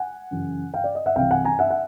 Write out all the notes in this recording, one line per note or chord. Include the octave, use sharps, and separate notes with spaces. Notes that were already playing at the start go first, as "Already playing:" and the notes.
Already playing: F#5 G#5
F#2 C#3 E3
F5 G5
D5
D#5
E5 F#5
C2 C3 E3 F5 G5
F#5 G#5
G#5 A#5
E5 F#5
F#5